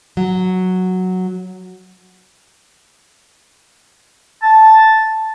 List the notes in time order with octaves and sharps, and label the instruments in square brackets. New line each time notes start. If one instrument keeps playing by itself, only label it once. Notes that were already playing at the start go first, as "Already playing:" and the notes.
[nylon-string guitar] F#3
[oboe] A5